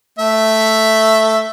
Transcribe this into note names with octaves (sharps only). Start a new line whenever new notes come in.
A3 E5